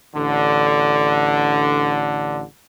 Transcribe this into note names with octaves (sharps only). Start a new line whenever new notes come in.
A1 D3